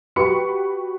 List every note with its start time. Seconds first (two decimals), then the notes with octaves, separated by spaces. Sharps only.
0.16 F#4 G4 B4 B5 C#6 C#7